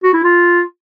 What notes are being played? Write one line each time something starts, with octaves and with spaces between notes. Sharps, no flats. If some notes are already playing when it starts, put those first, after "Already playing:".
F#4
E4
F4